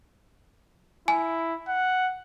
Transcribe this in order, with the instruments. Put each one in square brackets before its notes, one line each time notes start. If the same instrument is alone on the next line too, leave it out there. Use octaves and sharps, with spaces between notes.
[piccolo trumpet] E4 [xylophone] G#5
[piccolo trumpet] F#5